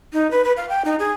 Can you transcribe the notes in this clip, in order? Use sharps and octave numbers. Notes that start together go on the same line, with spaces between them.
D#4
B4
B4
F5
G5
D#4
G#4